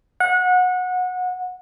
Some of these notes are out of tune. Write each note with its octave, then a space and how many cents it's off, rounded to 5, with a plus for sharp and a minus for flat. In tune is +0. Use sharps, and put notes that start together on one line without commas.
F#5 -25